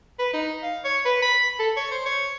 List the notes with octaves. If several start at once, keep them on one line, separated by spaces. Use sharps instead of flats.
B4
D#4
F5
C#5
B4
B5
A4
C#5
C5
C#5